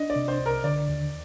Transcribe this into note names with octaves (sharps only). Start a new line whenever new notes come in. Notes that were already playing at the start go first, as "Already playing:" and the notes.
Already playing: D4 D#5
D5
C3
C5
C2
A#4
D3 D5
D#2